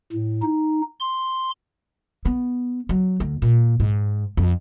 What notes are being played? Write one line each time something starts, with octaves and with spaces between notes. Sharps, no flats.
A2
D#4
C6
B3
F#3
D2
A#2
G#2
F2